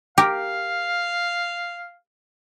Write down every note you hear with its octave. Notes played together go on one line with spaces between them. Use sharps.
G4 A#4 F5